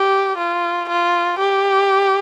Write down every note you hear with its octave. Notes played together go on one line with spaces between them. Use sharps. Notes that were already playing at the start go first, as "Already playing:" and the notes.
Already playing: G4
F4
F4
G4